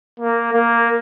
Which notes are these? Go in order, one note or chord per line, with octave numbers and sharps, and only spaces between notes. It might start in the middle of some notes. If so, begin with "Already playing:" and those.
A#3
A#3